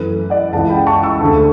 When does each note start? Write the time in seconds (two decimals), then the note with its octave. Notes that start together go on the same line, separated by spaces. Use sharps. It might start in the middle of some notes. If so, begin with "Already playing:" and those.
Already playing: F#2 E3 A3 B4
0.30 D5 F#5
0.52 C#2 C#3 E3 F#5 A5
0.70 G5 B5
0.87 A5 C#6
1.03 C#6 E6
1.21 D2 D3 A3